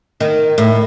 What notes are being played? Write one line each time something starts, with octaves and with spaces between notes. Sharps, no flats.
D#3
A2